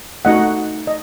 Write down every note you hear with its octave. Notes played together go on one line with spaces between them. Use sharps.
A3 D#4 F#4 D#5 F#5
D#5